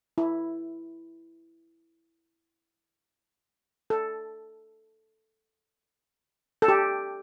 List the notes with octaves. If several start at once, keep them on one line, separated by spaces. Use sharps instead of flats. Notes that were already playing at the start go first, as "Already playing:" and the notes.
E4
A4
A4
G4